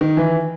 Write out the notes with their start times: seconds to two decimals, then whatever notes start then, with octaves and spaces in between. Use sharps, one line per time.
0.01 D#3
0.17 E3